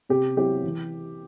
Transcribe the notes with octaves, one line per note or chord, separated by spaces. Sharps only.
C3 G4
F#3 C4 E4 G4
E3